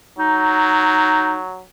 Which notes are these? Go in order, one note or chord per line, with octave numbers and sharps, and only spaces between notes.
F#3 D#4